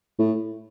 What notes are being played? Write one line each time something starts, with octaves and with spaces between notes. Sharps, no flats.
A2